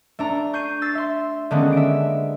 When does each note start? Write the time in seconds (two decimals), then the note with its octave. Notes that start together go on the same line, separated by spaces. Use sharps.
0.19 A3 D4 A#5
0.53 C#6 G6 C7 D#7
0.82 E6 A6 C7
0.95 E5 C6
1.51 D3 D#3 G#3 A#3 B3 C#4
1.72 E5 D7